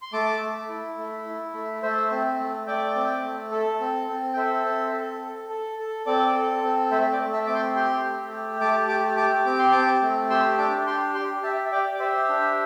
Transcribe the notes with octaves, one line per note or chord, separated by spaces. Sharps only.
C6
A3 A5 D6
A3
E4
A3
E4
A3
A3 C5 E5
C4
A3
A3 D5 G5
C4
A3
A4
C4
C4
G5
A4 C5 E5
C4
A4
A4
A4
A4
C4 A4 D5
A4
C4
A3 C5 E5
D5 G5
A3
E5 A5
C4 D6
G5 C6
G4 G5 C6
A3
G4
A3 A5 D6
G4 A5 D6
G4 A5 D6
C4 D6
C6
C4 A5 D6
A3
G4 C6 E6
D4 A5 D6
G4 G5 C6
G4 G5 C6
G4 E5 A5
E5
G4 D5 G5
D5
G4 C5 E5
D4